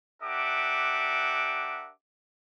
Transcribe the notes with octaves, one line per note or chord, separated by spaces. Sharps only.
D4 G4 A#4 E5 F#5 D6